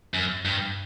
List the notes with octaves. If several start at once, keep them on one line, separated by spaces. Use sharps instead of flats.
F#2
G2